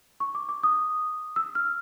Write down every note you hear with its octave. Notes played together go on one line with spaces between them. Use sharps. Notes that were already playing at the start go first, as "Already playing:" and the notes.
C#6
D6
D6
D#6
E6
F6